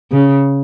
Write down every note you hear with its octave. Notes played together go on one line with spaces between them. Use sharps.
C#3